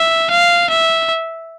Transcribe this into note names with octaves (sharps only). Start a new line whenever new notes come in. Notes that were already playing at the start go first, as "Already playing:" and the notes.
Already playing: E5
F5
E5